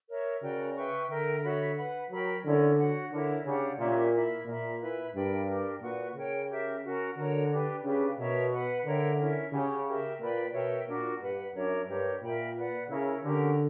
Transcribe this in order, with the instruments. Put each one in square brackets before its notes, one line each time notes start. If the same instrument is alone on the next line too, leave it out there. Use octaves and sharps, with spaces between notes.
[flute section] A#4 C#5 E5
[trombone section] C#3 [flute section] F#4 A#4 D5 G5
[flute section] B4 E5 G5 C#6
[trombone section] D3 [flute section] A#4 E5 G5
[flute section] F#4 C#5 E5 B5
B4 F#5 B5
[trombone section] F#3 [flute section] A#4 C#5 G5 B5
[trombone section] D3 [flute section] C#4 E4 A#4 D5
[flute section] F#4 C#5 F#5
[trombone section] D3 [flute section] E4 A#4 C#5
[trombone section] C#3 [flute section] D4 G4 C#5 F#5
[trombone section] A#2 [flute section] C#4 G4 C#5 E5
[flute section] E4 A#4 E5 B5
[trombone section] A#2 [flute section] A#4 E5 B5
[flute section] E4 B4 E5 B5
[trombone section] G2 [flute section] A#4 D5 G5 B5
[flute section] D4 G4 A#4
[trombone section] A#2 [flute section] F#4 B4 F#5 C#6
[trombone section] C#3 [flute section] A#4 C#5 G5
[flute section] G4 A#4 E5
C#4 F#4 A#4
[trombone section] D3 [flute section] F#4 A#4 C#5
[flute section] D4 G4 B4
[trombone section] C#3 [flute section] D4 G4 B4
[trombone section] B2 [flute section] A#4 C#5 E5
[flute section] B4 F#5 B5
[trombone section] D3 [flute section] A#4 C#5 E5 G5
[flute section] C#4 E4 A#4
[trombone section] C#3 [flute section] G4 C#5 F#5
[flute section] G4 A#4 E5
[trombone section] A#2 [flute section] B4 D5 G5 B5
[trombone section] B2 [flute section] A#4 C#5 E5 G5
[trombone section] A#2 [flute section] D4 F#4 A#4
[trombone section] G2 [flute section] B4 F#5 B5
[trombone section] F#2 [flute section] D4 A#4 C#5 E5
[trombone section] G2 [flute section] G4 A#4 C#5
[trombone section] A#2 [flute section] A#4 E5 G5 B5
[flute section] B4 D5 F#5
[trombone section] C#3 [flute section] E4 A#4 C#5
[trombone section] D3 [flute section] C#4 G4 A#4